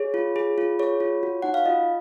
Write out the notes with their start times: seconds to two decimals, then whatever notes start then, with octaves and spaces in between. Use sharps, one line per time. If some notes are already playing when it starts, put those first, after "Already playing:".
Already playing: G#4 C#5
0.14 F4
0.36 G#4
0.58 F4
0.79 G#4 C#5
1.00 F4
1.23 F#4
1.42 D#4 F#5
1.54 F5
1.65 F4 D#5